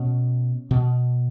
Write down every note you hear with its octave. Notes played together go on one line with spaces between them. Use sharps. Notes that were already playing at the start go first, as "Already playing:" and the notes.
Already playing: B2 C#4
B2